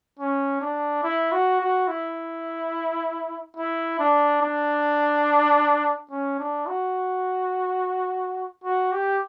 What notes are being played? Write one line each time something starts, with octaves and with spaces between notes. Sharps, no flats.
C#4
D4
E4
F#4
F#4
E4
E4
D4
D4
C#4
D4
F#4
F#4
G4